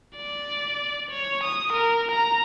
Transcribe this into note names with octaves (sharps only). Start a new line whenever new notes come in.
D5
C#5
D#6
A#4
A#5